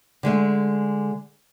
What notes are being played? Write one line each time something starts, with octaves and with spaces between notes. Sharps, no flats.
D3 G#3 A3